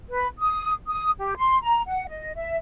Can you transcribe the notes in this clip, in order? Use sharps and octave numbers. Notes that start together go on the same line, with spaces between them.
B4
D#6
D#6
G4
C6
A#5
F#5
D#5
E5